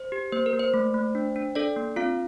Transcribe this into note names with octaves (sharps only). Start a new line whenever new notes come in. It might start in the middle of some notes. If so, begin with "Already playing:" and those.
Already playing: C5
G4
A#3 C5
A#4
A#3
C5
A3
A3
D4
D4
D4 A4 D5
A#3
C4 F4 F5